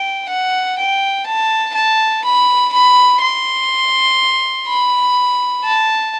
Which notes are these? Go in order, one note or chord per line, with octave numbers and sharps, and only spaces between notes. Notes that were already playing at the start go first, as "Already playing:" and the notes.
Already playing: G5
F#5
G5
A5
A5
B5
B5
C6
B5
A5